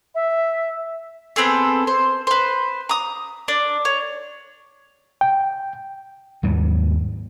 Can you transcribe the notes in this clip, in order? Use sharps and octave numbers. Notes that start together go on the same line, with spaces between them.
E5
B3 C4 G#4 A4
C5
B4 C5
A#5 D#6
D4
C#5
G5
D#2 G#2 F#3 G3